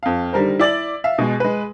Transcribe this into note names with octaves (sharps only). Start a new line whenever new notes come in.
F2 F5
D3 D#3 G3 A#4 C5
E4 D5 A6 F#7
E5 F5
B2 G#3
G#3 B4